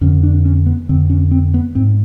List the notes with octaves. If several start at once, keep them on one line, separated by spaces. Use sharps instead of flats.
F2 D3 C#4
D4
C#4
B3
F2 D3 C4
C#4
C4
B3
G#2 C4